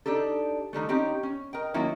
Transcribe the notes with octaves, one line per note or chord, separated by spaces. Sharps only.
D4 D#4 G4 A4
D3 D#3 G3 A3
C4 C#4 D#4 G4
C#4
A#4 D#5 G5
D#3 F#3 A#3 C#4 E4